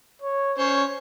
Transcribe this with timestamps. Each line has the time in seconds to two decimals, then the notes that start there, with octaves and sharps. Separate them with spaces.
0.22 C#5
0.58 C#4 C5 C#5